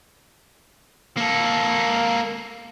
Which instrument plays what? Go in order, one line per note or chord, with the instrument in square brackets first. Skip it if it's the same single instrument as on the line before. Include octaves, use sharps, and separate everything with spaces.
[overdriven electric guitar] A#3 A4